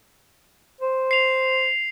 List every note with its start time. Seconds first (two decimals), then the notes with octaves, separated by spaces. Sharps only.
0.81 C5
1.11 C7 F7